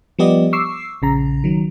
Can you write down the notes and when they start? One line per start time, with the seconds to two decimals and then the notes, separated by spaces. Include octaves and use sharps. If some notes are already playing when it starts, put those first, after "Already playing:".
0.19 F3 G3 B3 G4 D5 D#5
0.53 C#6 D6 E6 C7
1.02 A#1 C#3 A#5
1.44 D#3 F#3